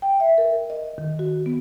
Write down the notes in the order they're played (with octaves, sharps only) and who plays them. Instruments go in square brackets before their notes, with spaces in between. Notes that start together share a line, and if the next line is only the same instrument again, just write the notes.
[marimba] G5
E5
A#4
D#5
D#3
F#4
B3